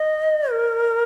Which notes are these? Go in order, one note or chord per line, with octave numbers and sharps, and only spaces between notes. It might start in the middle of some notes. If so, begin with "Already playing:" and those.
Already playing: D#5
A#4